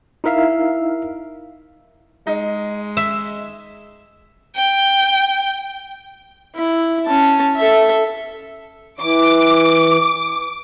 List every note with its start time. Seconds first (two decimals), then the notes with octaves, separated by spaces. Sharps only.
0.24 D#4 E4 A#4 E5 F5
2.27 G#3 D#4
2.97 E5
4.56 G5
6.56 E4
7.06 C#4 A5
7.57 A4 E5
8.99 E3 D6